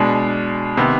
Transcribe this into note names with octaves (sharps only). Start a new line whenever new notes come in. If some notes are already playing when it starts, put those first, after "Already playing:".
Already playing: B2 G#3 D4
C3 D#3 B3